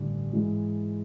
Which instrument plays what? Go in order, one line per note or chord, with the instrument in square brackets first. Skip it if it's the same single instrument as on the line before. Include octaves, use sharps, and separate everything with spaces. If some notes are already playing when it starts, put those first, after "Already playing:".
Already playing: [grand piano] A1 G2 D3
G#2 E3 G#3